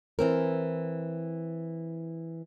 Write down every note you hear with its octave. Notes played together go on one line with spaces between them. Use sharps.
E3 C4 A#4